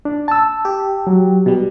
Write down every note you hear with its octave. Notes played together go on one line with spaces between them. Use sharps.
D4
A5 E6
G4
F#3
B2 G3